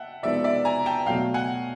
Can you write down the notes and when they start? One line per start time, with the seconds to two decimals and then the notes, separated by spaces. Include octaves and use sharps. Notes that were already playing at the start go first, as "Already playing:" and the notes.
Already playing: E5 F#5 G5 A5
0.23 C3 F3 G#3 B3 D#4 D5 E5
0.44 D5 E5
0.65 G#5 A#5
0.86 G5 A5
1.06 B2 F#3 A3 F5 G5
1.34 F#5 G#5